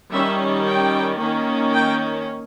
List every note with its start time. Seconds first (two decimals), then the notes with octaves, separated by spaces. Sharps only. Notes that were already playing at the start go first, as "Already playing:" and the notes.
0.12 D#3 G3 C#4 E5
0.66 G5
1.19 D#3 A#3 C#4
1.73 G5